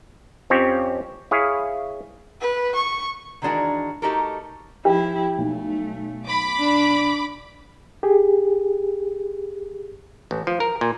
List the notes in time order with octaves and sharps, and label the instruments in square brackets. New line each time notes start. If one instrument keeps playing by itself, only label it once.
[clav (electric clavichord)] F2 F3 C4 C#4 G4 C#5
E4 G#4 C#5 F5
[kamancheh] B4
C#6
[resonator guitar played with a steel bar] D#3 E3 G#3 D4 F#4 A#4
A3 D#4 F#4 G4 A4 A#4
[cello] F3 E4 [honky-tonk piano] G4
[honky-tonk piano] B1 [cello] A3
[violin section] B5 D6
[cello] D4
[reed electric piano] G4 G#4
[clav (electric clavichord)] A1
F3
A#4
A#2